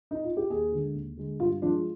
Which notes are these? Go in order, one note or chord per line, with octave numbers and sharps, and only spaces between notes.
D#4
F4
G4
D#2 G#4
D3 G#3
D#2
D3 G#3
G2 F4
F3 G#3 D4